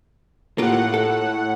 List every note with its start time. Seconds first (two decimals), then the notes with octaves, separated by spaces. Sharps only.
0.58 A2 A#3 F4 G4 F#5
0.94 A4